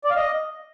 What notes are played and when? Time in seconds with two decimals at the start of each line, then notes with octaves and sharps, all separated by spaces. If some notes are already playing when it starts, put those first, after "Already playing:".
0.04 D5
0.10 F5
0.16 D#5